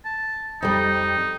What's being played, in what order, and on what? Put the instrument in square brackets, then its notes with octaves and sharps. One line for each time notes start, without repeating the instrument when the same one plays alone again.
[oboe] A5
[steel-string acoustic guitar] F2 G3 [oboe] D#4